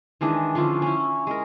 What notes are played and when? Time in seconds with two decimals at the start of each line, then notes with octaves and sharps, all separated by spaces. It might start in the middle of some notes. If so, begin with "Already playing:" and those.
0.21 D#3 E3 G#3 D4
0.55 D3 F3 C#4 F4
0.82 C#4 E4
1.27 G#3 A#4